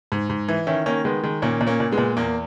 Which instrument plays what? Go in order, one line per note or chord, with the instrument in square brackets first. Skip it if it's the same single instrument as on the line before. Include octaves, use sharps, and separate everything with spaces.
[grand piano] G#2
G#2
E3
D#3 C#4 E4
D#3 A#3 C#4
D#3 G#3 B3
D#3 G#3
A#2 A#3 C#4
A#2
A#3 C#4
A#2
G#3 B3
A#2
E2 A#3